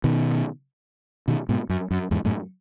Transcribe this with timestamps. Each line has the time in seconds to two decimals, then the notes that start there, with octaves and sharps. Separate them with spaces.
0.04 B2 D#3
1.28 B2 D#3
1.49 G#2 B2
1.69 F#2
1.91 F#2
2.11 E2 G#2
2.25 F#2 A2